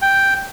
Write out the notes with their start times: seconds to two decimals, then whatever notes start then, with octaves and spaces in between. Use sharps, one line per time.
0.02 G5